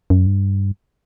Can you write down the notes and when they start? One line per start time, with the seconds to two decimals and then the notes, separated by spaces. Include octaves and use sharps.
0.10 F#2
0.26 G2